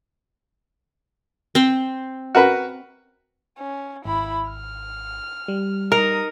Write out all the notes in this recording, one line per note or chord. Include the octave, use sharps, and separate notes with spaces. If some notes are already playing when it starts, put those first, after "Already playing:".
C4 C5
F#4 A#4 B4
C#4
G#1 E4 B5
F6
G3
D#4 A#4 D#6